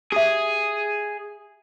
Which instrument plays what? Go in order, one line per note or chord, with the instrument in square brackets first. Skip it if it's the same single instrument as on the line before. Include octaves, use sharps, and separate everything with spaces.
[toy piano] G4 E5 [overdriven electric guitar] G#4